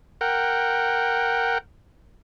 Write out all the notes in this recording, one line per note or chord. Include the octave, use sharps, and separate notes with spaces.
A#4 F#5 G5